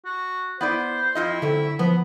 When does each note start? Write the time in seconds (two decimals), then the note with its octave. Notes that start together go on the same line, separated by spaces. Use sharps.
0.05 F#4
0.61 B3 E4 C5 D5
1.15 F2 E4 F4 D#5
1.42 F#2 D3 A3 C4
1.79 F3 B3